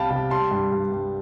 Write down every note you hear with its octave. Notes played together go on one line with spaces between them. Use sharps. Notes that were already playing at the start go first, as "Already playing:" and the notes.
Already playing: C2 C3 G3 F5 G5 A5 B5
C3 F5 A5
G3 A5 C6
G2
G2
G2